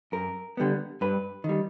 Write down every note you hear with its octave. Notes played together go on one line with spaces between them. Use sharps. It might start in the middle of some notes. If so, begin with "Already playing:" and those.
F#2 A#4
D3 G3 B3
G2 B4
D#3 G3